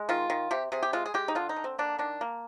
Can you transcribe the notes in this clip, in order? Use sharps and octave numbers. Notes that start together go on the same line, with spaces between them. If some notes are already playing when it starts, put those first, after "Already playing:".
Already playing: G#3
D#3 F4
D#3
C3 G4
C3 G#4
G4
G#3 F4
G#4
G#3 G4
D#4
D3 F4
D#4
D3
C4
A#3 D4
D#3 D4
A#3